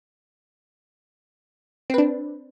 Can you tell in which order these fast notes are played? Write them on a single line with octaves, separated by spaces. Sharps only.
C4 B4 D4